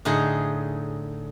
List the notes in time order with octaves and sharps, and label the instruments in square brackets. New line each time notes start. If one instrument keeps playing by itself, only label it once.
[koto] A2 D3 D#4 G#4